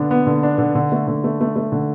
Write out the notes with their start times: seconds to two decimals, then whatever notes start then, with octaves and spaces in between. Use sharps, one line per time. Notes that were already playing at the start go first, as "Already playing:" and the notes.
Already playing: D3 B3 D4
0.11 B3
0.27 D3
0.43 D4
0.58 D3
0.75 D3
0.92 A3
1.07 D3
1.24 A3
1.41 A3
1.56 A3
1.72 D3